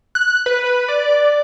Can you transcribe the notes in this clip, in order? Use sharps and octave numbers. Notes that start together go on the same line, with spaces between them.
F#6
B4
D5